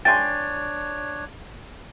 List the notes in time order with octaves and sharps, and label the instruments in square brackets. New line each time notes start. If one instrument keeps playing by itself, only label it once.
[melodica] D4 C#5 [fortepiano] G5 G#5 C6 [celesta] A6